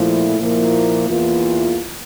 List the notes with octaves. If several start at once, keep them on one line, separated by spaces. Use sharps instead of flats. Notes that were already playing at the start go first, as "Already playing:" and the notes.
Already playing: A#2 F3 A3 E4
A#2 F3 A#3 E4
E2 E3 A#3 F4